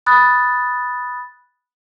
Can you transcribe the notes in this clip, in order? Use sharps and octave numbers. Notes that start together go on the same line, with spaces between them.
B5 D#6 F#6 A6